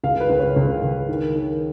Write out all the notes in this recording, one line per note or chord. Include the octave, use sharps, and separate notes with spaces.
C#2 F5
B4
C#2
C#5
C#2
C#2
D#3
D#3